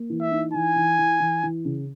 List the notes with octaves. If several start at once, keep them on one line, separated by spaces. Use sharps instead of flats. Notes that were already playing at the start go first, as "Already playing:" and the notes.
Already playing: A#3
E3
E5
D#4
E3 G#5
E3
E3
E3
E3
C#3